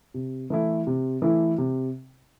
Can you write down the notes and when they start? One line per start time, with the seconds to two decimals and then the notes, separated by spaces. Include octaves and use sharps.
0.14 C3
0.50 E3 A3 E4
0.87 C3
1.22 E3 A3 E4
1.58 C3